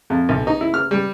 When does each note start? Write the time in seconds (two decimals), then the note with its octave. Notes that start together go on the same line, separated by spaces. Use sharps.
0.10 F2
0.29 B1
0.47 D#4
0.61 E4
0.74 F6
0.91 G3